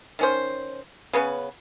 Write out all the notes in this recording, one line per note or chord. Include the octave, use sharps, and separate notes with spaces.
D#3 C#4 C5
C#3 B3 C#4 B4